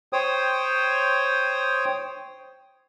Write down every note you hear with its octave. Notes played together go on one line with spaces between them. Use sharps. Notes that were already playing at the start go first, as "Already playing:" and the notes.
C5 C#5 G5 D#6